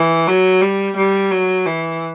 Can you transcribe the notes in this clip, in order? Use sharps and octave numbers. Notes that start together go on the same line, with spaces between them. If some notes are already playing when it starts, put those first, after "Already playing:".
Already playing: E3
F#3
G3
G3
F#3
E3